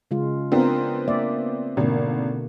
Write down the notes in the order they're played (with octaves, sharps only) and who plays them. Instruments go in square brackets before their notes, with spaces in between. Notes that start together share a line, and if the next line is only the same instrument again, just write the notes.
[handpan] C#3 G#3 F4
[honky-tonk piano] B3 C4 D4 [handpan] F4 A#4
[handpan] A#3 D5 E5
[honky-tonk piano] G#1 [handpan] B2 D3 A#3